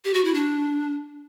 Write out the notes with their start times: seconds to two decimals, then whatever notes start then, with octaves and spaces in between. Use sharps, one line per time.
0.05 G4
0.14 F#4
0.24 E4
0.34 D4